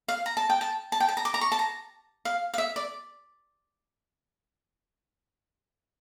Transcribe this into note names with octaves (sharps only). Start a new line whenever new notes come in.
F5
A#5
A5
G5
A5
A5
G5
A5
A#5
D6
A#5
C#6
A5
A#5
F5
F5
E5
D5